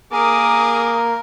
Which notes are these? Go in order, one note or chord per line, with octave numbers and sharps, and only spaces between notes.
A#3 G#4 A#4 D6 D#6